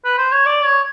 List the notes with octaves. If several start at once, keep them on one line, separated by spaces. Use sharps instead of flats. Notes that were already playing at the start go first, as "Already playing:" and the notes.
B4
C5
C#5
D5
C#5